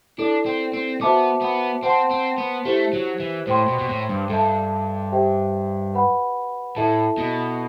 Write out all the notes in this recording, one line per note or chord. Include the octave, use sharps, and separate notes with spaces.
D4 E4 A4 D5
C4
C4
B3 F#4 C5 E5 A5 D6
B3
C4 C5 F#5 A5 C6
C4
B3
A3 E4 G4 C5
F#3
E3
A2 C5 G5 C6
B2
B2
A2
G2
G2 A4 E5 A5
G4 C5 E5 G5
B4 F#5 B5
A2 E4 A4 E5 A5
B2